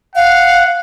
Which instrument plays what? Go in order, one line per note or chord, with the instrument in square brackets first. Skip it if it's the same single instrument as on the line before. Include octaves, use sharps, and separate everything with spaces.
[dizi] F5 [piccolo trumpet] F#5